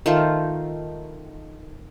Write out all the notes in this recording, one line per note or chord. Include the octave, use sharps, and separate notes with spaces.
D#3 A3 F4 C5